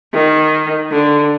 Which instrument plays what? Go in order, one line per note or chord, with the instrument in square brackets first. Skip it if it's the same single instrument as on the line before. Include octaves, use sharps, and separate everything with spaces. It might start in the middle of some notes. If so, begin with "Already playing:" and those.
[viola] D#3
D3